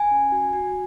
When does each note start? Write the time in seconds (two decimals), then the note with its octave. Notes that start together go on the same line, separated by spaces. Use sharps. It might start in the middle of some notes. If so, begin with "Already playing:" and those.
Already playing: G#5
0.11 C#4
0.32 F#4
0.53 F#4